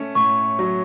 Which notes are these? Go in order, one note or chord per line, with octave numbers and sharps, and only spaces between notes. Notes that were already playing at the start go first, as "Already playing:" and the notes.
Already playing: A3 C#4
A2 C#6
F#3